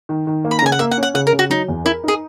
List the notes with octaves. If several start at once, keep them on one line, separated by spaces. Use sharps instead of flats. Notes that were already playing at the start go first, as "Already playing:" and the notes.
D#3
D#3
A#3
B5
A#5
C#3 G#5
F#5
A#3 E5
F#5
C#4
F#5
C#3 F#5
A#4
C#3
F#4
F#3 D#4
E2
E4 A#4
D#4 G#4